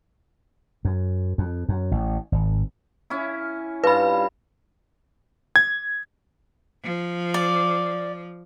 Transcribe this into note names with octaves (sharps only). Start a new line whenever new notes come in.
F#2
F2
F#2
A1
G#1
C#4 E4
G2 F4 B4 B5
G#6
F3
D5